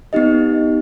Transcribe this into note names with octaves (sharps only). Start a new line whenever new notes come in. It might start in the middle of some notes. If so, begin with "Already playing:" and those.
B3 D#4 G4 D#5